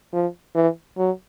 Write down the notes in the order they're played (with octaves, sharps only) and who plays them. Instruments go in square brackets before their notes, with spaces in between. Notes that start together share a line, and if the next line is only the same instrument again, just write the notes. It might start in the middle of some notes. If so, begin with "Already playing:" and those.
[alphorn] F3
E3
F#3